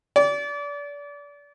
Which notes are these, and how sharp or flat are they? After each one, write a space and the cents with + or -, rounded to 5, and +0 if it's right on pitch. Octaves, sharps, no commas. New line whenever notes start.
D5 -30